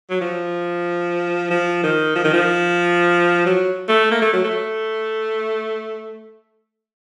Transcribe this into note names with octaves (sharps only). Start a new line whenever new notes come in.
F#3
F3
F3
D#3
F3
D#3
F3
F#3
A3
A#3
A3
F#3
A3